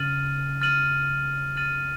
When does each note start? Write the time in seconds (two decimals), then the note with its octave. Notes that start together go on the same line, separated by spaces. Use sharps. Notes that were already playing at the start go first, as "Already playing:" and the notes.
Already playing: C#3 F6 A6 D#7 F#7
0.61 F6 A6 D#7 F#7
1.57 F6 A6 D#7 F#7